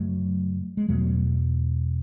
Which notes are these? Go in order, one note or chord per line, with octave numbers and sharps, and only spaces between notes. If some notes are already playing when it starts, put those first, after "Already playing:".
Already playing: F#2 C#3 F#3 A3
G#3
E2 B2 F#3 A3